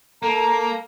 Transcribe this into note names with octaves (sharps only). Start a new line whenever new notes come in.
A#3 A4 A#5